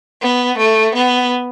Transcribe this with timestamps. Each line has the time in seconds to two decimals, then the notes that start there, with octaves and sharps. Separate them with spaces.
0.22 B3
0.58 A3
0.95 B3